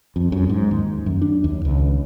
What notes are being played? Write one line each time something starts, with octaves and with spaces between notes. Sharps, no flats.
F2
F#2
G#2
D#2
F#2
D4
D#2
C#2